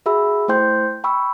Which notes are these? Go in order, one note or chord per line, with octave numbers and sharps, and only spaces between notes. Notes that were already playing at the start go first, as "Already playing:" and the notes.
F#4 G#4 E5 B5 E6
A3 E4 C5 G5 C6 G6
G5 B5 C#6 E6